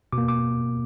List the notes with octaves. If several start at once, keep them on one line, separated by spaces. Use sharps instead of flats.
B2 D6
A#3
D6